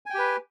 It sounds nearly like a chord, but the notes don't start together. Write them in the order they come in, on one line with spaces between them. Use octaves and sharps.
G#5 G5 G4 B4